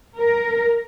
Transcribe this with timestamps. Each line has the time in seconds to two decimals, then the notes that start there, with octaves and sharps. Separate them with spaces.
0.19 A#4